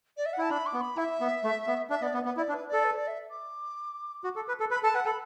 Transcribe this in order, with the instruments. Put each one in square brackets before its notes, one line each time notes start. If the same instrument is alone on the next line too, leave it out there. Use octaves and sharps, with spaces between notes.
[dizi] D5
E5
F#5
[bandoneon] E4 [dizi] A5
[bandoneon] D4 [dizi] B5
[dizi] D6
[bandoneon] B3
[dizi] B5
[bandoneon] E4 [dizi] E5
[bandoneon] B3
A3
B3
[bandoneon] D4 [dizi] E5
[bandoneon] B3 [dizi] D5
[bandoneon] B3 [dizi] B4
[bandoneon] B3 [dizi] B4
[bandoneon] E4 [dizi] D5
[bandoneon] D4
[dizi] B4
[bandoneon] A4 [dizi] D5
[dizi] B4
D5
E5
D6
[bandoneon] F#4
A4
B4
A4
[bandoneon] B4 [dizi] B5
[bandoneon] A4 [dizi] A5
[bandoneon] B4 [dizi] F#5
[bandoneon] A4 [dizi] B5